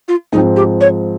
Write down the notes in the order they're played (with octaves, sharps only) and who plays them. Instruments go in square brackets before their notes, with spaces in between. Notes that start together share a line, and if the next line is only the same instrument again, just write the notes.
[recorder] F4
[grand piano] G#2 F3 C4 [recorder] D#4
[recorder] G4
C#5